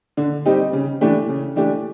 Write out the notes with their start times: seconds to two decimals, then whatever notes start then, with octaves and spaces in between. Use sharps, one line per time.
0.17 D3
0.46 G3 C4 D#4 G4
0.73 C#3
1.01 E3 A3 D4 G4
1.29 C#3
1.56 E3 A3 D4 G4